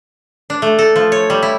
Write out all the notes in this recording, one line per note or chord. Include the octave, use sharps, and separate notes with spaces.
D4
A3
A4
F3
C#5
G3
E4